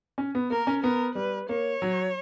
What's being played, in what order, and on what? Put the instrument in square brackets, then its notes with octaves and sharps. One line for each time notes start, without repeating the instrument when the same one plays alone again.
[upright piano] C#4
B3
[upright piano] A#3 [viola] A#4
[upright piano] C#4
[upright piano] B3 [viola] A#4
[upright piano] G3 [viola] B4
[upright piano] A#3 [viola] C#5
[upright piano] F#3